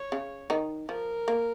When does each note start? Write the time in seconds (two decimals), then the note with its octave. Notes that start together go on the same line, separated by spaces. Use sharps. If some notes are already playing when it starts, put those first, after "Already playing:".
Already playing: C#5
0.12 C#3 C#4
0.50 D#3 D#4
0.89 F3 A#4
1.28 A#3